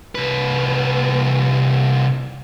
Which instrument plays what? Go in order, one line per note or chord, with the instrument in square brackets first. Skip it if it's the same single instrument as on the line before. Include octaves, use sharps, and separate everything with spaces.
[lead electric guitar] C2 B4